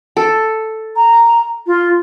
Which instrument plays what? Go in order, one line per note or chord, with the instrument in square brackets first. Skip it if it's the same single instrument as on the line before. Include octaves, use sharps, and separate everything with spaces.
[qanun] A4
[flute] A#5
F4